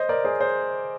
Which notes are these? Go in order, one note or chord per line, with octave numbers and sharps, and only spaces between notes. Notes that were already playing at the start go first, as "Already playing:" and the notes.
Already playing: C5 D#5
A#4 D5
G#4 C5
G#4 C5